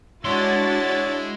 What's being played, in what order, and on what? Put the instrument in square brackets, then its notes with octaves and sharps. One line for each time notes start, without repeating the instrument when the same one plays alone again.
[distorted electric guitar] G#3 C6 [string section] D4 F#4 A6 [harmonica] E4 [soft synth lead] C#5